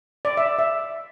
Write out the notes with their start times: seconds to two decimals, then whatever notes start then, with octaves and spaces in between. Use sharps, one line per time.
0.25 D5
0.37 E5
0.59 E5